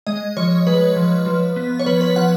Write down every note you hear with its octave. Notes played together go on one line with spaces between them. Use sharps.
G#3 D#5
F3 C#5
G#3 B4
F3
F3
B3
C#5
F3 B4
B4
F3 F#5